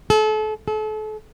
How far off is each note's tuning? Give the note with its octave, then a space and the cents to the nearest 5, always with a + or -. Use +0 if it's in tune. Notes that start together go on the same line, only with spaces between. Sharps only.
A4 -35
A4 -35